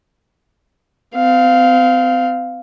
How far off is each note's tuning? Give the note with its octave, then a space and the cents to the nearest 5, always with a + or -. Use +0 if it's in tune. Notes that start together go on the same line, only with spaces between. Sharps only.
C4 -35 F5 +0